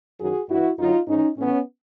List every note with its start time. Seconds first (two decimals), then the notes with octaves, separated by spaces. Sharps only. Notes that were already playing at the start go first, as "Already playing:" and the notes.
0.19 F#2 D#3 F#3 F#4 G#4
0.49 G2 E3 E4 F#4
0.79 F#2 D3 F#3 D#4 F4
1.08 G#2 E3 C#4 D#4
1.37 A2 E3 B3 C#4